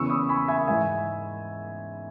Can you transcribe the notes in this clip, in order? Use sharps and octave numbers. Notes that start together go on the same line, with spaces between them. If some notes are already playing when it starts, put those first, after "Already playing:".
Already playing: E2 C#3 E3 C#6 E6
B5 D#6
G#5 B5
E5 G#5
G#2 E3 E5 G#5